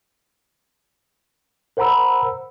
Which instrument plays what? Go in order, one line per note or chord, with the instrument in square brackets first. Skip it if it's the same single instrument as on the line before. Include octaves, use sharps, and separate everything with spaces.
[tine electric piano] A#4 C5 F#5 A#5 B5 E6